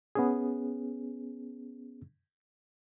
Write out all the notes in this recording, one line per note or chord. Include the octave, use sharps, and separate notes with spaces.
B3 C#4 G#4